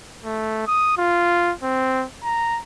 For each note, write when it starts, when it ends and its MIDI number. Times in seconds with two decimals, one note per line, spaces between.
0.24 0.65 57
0.67 0.98 87
0.98 1.52 65
1.63 2.06 60
2.24 2.60 82